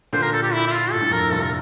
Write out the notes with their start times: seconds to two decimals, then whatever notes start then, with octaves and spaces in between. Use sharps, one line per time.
0.13 A#2 D3 C5
0.22 A#4
0.33 A4
0.42 G4
0.53 E4
0.67 E4
0.72 F4
0.92 A2 A4
1.02 G2
1.11 F2 A2 A#4
1.28 C3
1.32 G2 A#2 A4
1.43 A#4